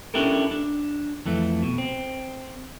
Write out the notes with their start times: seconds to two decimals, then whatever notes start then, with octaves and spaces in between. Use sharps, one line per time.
0.14 C#4 D4 E4 G4 A4 A#4
0.51 D4
1.26 F2 E3 A3
1.62 B2
1.78 C4